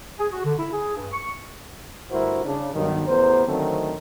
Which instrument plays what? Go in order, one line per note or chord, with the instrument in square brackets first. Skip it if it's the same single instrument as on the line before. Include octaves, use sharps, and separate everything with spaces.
[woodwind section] G#4
F#4
D3
E4
G#4
G2
C#6
[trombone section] D2 G2 E4 F#4 A#4 C5
C#3 D4
B1 G2 D#3
A1 E2 B3 A#4 C5
D3 D#3 F#3 A3 C4